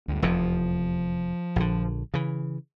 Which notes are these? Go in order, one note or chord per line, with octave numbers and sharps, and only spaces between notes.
D2 G2
F1 E2 C3 F3
A#1 D3
C#3 E3